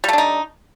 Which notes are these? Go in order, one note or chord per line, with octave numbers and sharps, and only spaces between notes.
G3 A3 D4 D#4